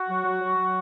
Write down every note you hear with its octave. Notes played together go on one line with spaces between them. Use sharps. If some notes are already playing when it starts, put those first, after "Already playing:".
Already playing: F#4
F#3
F#3
F#3
F#3